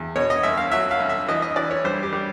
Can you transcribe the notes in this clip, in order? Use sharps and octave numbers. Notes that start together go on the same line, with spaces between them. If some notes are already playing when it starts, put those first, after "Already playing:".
Already playing: E2
B2 C#5
D#5
C2 E5
F5
F#3 E5
F5
C2
E5
E3 D#5
D#5
E3 D5
C#5
G3 C5
G4
G3